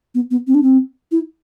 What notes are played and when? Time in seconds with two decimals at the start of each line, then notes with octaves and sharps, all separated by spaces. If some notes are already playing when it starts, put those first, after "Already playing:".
0.15 B3
0.31 B3
0.47 C4
0.55 D4
0.63 C4
1.12 E4